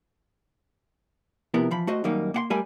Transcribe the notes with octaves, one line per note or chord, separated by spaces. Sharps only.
C3 F3 B3 E4 A#4
E3 F3 B5
A3 F#4 C5 D#5
F#2 D#3 G3 A#3 D#4
A#3 F#5 C6
G3 A3 A#4 G#5 B5